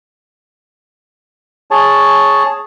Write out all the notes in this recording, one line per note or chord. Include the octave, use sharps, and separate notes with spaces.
G#4 C#5 A5